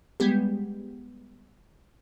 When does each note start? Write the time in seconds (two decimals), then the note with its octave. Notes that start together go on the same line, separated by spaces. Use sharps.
0.20 G3 G#3 B3 G4